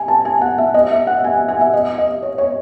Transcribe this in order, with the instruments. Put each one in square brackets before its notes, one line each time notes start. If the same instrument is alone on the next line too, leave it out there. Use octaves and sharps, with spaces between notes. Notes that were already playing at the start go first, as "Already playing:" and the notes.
Already playing: [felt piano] G#5
A5
G#5
F#5
E5
D#5
E5
F#5
G#5
G#5
E5
D#5
D#5
C#5
C#5